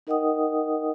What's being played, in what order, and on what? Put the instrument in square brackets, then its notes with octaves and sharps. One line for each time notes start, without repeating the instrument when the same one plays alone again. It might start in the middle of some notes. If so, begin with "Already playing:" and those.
[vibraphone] D#4 A#4 D#5 F#5 G5 D#6